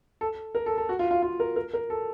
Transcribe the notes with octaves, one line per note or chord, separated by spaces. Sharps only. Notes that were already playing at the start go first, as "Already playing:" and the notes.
A4
A#4
A4
A4
F#4
F4
F4
F4
A#4
A#4
A#4
A4